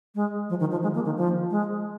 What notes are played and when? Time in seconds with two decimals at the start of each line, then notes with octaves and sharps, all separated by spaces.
0.15 G#3
0.50 F3
0.60 D#3
0.71 F3
0.83 G#3
0.95 A#3
1.05 D#3
1.17 F3
1.51 G#3